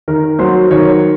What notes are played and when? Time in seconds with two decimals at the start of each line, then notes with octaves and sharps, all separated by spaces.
0.08 D#3 A#4
0.39 F#3 C5
0.70 D#3 C#5